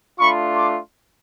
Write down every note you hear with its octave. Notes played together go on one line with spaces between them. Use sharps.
A3 D4 F4 B5 C#6
C6 D6